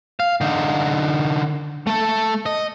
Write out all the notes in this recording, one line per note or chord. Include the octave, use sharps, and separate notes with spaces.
F5
D3 D#4
A3 A4
D#5